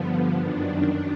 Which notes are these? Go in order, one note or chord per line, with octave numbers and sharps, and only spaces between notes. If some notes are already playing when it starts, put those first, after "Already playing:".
Already playing: G2 D3 F3 B3
F#2 D#3 D4